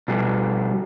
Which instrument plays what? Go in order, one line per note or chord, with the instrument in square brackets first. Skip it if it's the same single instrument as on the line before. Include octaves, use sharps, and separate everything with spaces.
[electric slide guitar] B2 G3